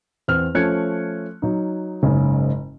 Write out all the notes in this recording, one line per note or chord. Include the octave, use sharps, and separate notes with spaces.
E2 C4 F6
F3 A3 C#4 F#6 G#6 C#7
F#3 D#4
F#1 G#2 C#3